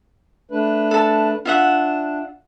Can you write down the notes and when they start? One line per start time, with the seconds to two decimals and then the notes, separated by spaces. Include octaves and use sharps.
0.51 A3 D4 B4
0.91 A4 A5
1.45 D4 F4 E5 F#5